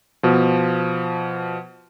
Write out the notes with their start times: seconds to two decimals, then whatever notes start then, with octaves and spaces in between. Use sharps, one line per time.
0.23 B2 F3